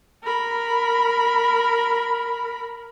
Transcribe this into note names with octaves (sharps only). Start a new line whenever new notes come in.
A#4 B5